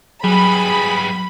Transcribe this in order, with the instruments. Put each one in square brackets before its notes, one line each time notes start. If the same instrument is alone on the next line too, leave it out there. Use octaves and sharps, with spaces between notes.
[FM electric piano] F#3 [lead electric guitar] G3 B3 [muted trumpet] G#4 [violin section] B5